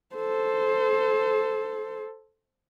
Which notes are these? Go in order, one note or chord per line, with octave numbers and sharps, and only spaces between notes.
A4 C5